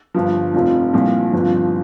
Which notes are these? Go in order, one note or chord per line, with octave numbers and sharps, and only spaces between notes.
G1 G2 F3
F1 F2 F3
C2 A#2 F3
G1 F2 F3